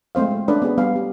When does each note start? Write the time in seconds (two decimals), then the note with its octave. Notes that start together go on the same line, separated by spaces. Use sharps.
0.15 G#3 A3 C4 C5 F5
0.31 G#3
0.48 A3 C#4 D4 B4 D5
0.62 B3 G#4
0.78 G3 B3 F5 G#5 B5
0.96 G4